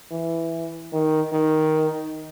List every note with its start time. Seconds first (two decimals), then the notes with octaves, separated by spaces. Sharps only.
0.11 E3
0.93 D#3
1.32 D#3